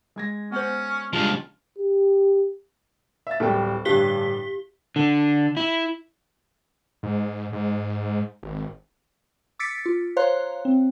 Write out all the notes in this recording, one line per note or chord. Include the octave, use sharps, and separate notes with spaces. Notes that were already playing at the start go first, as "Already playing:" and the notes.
G#3 G#6 A#6
B3 C#4 C5
C#2 F3 G3 G#3 D4 F4
G4
E5 A6
D1 G3 A3 G5
A1 G2 D3 G4 B6 G7
D3
E4
G#2
G#2
G#1
D6 E6 A6 B6 C#7 D7
F4
C5 C#5 F5 A#5 C6 F#6
C4